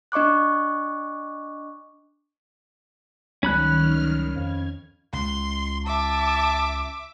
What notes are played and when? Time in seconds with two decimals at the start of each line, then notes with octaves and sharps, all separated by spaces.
0.12 D4 D#5 C#6 D6 F#6
3.43 C#2 D#3 F#3 G3 C#4 B5 F6 F#6
4.36 F2 G#6
5.13 C#2 C6
5.86 E5 A5 D6